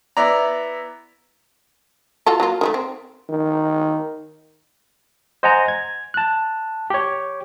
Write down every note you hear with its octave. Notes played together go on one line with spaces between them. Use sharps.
B3 E4 D5 A#5
F4 F#4 A4
F#3 A#3 F4
D#3 G#3 A3
C4
D#3
C5 D#5 F#5 G#5 A#5
G#6
A5 F#6
G4 C#5